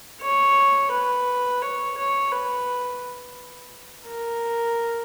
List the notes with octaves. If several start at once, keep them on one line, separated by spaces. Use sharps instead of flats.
C#5
B4
C#5
C#5
B4
A#4